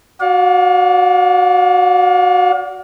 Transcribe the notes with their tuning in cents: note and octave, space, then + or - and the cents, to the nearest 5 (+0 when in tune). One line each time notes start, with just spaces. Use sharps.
F#4 +0 D5 -25 F5 +40